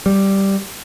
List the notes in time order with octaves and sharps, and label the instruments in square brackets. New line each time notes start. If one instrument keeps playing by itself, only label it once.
[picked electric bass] G3